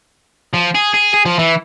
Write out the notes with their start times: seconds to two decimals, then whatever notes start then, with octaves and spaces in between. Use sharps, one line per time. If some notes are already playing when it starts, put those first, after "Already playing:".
0.53 F3
0.75 G#4
0.94 G#4
1.14 G#4
1.26 F3
1.39 E3